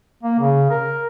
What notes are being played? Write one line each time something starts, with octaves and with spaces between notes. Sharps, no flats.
A#3
C#3
A#4